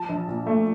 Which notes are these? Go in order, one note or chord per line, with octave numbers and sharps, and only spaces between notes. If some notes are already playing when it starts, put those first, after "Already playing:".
Already playing: F3 A5
A#1
A#2
A3